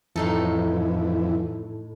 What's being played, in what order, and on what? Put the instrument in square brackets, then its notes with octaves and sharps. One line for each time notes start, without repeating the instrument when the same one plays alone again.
[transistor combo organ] F2 E3 [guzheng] A2 D#4 A4